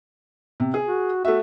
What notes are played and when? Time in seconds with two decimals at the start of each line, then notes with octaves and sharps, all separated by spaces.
0.60 C3
0.74 G#4
0.87 F#4
1.25 A3 F#4 E5